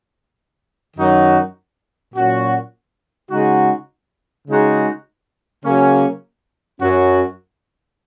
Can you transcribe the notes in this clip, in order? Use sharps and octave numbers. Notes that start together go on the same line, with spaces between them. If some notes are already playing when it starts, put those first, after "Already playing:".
F#2 D#3 F#3 D#4 F#4
A#2 F#3 C#4 F#4
C#3 G#3 D#4 F#4
C#3 G#3 D#4 F#4
C#3 F#3 A#3 C#4
F#2 F#3 C#4 F#4